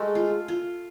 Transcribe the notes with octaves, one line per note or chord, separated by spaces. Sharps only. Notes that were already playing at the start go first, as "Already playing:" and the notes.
Already playing: G#3 A3
F4
F4